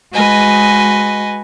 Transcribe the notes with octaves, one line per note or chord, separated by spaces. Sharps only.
G#3 F#4 B4 D#5 G#5